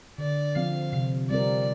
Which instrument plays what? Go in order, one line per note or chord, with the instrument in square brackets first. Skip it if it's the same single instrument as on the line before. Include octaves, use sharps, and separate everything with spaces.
[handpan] D3 [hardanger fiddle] D5
[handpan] F3 C4 [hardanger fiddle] F5
[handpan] C3
[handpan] G3 C4 F4 A#4 [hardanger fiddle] D5